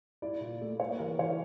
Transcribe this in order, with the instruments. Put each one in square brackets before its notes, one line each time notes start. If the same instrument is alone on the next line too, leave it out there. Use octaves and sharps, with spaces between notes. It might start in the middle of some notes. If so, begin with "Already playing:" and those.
[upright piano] E4 D5
A#2
A3
A#3 C#5
E3 A#4
E3 C#5